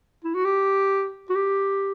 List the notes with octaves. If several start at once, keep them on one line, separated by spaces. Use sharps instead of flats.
E4
F#4
G4
F#4
G4